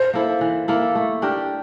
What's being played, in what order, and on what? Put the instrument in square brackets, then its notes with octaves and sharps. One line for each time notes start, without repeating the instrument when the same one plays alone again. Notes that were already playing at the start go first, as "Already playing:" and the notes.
Already playing: [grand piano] C5
[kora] A#3 E4 A4
E3
A#3 E4 A4
A3
D4 G4 A#4